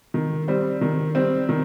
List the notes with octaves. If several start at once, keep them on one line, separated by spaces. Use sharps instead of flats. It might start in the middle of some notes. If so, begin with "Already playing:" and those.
D#3
G3 C4
D#3
G3 C4
D#3